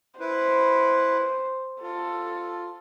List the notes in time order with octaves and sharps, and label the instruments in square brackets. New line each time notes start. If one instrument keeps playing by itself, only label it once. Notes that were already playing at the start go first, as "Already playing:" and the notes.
[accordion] E4 B4 [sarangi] C5
[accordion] F4 [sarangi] A4